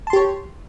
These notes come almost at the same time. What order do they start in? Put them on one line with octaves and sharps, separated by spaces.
A5 C6 G4 C#5